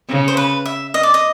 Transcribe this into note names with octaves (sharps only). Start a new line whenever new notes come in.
C#3
C5
B4
E5
D#5
D5
D#5